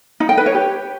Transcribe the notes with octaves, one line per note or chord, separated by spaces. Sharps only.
D#4
G5
B4
C#5
G4